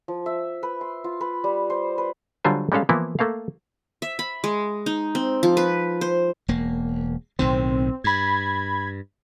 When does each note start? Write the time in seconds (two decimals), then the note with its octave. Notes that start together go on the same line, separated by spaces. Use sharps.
0.08 F3
0.26 E5
0.63 B4
0.81 C6
1.04 F4
1.21 B4
1.44 G3
1.70 C5
1.98 B4
2.44 D3 F#3 G3 F4 C5 G#5
2.72 G3 G#3 C#4 A4 F5
2.89 E3 F3 A#3 B3 E4
3.19 A3 A#3 A4 F5
4.02 E5
4.19 B5
4.44 G#3
4.86 D#4
5.15 C4
5.43 F3
5.57 B4
6.01 C5
6.48 E1 A#3
7.39 B1 A2 D#3 C4
8.04 G2 B5 G#6